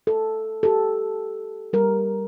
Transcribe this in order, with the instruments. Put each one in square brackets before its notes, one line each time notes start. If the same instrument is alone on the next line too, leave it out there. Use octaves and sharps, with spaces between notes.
[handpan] A4
G4 A4
G3 A#4